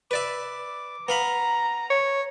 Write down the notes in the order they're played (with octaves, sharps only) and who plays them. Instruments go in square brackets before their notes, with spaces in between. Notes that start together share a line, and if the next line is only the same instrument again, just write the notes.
[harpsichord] B4 D5 E5 [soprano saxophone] D6
[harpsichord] B3 F5 B5 [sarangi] A#5
[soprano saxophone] C#5